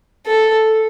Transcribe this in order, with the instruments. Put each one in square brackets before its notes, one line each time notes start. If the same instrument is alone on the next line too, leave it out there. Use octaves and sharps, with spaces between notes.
[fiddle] A4